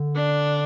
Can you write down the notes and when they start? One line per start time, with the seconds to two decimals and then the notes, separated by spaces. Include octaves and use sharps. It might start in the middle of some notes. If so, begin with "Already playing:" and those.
Already playing: D3
0.16 D4